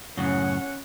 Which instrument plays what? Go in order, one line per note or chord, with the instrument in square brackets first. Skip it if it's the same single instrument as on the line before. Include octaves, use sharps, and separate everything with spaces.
[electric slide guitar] F#2 A2 C#3 [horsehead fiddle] C#4 F#5